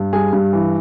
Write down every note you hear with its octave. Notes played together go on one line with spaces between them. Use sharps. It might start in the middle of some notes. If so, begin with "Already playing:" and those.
Already playing: G2
G3 G#4 G#5
G2
E3